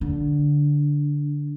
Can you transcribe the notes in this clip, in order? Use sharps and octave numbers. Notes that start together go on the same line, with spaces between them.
D3